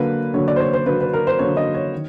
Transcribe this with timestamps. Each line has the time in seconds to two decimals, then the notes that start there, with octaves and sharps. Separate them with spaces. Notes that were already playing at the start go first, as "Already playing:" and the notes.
Already playing: D3 F#3 A#3 B4
0.34 D3 F#3 A#3 C#5
0.48 D5
0.56 C5
0.60 C#5
0.73 C5
0.86 D3 F#3 A#3 B4
1.01 B4
1.13 A#4
1.27 C5
1.39 D3 F#3 A#3 C#5
1.57 D#5
1.75 C#5
1.93 D#3